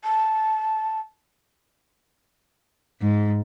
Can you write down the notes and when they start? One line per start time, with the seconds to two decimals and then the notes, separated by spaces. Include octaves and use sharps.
0.04 A5
3.03 G#2